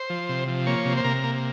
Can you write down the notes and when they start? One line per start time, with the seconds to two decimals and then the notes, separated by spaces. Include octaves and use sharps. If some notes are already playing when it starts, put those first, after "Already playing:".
Already playing: C5
0.10 F3
0.29 C3
0.48 F3
0.66 A#3 C#5
0.85 C3
0.97 C5
1.04 C3 A#4
1.24 A#3